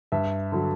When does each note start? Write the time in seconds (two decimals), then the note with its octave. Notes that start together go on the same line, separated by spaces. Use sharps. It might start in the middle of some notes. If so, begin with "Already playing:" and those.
0.12 G2 E5
0.52 D3 F#3